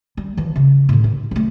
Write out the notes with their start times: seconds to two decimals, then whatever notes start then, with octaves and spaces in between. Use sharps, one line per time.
0.17 G3
0.37 E3 F3
0.56 C#3
0.89 A2 D3
1.04 D#4
1.31 F#3 A3